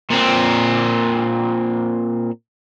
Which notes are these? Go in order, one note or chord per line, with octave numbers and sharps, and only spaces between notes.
A#2 C4